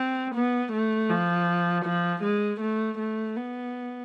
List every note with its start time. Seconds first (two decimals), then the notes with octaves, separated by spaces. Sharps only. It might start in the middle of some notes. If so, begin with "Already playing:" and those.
Already playing: C4
0.35 B3
0.73 A3
1.10 F3
1.85 F3
2.23 G#3
2.61 A3
2.98 A3
3.36 B3